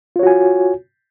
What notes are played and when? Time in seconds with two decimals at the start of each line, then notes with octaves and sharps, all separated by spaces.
0.16 F4
0.19 C#5
0.23 F#4
0.27 G#5